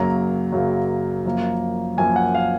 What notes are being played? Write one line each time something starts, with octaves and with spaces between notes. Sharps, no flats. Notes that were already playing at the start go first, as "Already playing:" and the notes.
Already playing: F#2 C#3 F#3 A#3 A#5
F#2 C#3 F#3 A#3
F#2 F3 A#3
F#2 F3 A#3 G#5
F#5
F5